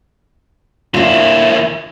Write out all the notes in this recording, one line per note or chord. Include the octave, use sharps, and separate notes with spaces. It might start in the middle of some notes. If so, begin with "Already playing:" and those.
D#2 D4 E4 F4